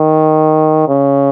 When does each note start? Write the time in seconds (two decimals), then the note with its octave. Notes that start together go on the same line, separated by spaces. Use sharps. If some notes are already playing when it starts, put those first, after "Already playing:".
Already playing: D#3
0.88 C#3